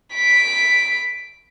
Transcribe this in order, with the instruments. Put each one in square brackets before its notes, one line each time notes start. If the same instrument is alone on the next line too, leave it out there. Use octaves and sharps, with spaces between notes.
[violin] B6 D7